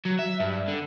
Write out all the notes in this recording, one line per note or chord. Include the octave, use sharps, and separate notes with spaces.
F#3
E5
G2
D3